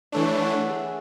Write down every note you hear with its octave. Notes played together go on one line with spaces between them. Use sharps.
E3 A3 D4 C#5
B4
C#5
F#5
E5
G#4